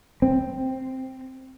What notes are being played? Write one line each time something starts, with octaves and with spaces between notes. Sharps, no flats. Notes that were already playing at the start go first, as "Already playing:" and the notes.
C4